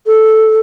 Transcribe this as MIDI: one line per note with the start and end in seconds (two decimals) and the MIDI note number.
0.06 0.60 69